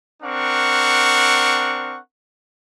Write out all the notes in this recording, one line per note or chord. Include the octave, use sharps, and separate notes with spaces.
C4 D4 A#4 F#5 C#6